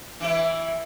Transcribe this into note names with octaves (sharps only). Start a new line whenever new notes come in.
E3 E4 B4